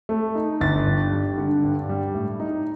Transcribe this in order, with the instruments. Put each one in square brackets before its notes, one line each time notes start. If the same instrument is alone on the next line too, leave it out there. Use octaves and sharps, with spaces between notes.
[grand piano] A3
D#4
G1 A6
G2
G3
D3
G2
G3
A2
D#4